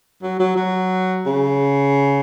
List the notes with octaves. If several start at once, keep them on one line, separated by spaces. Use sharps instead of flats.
F#3
F#3
F#3
C#3